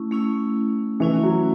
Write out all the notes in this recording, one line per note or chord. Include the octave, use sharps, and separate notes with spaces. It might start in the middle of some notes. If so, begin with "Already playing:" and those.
Already playing: A3 C#4 E4
A3 C#4 E4
E3 A3 C#4 E4
F#3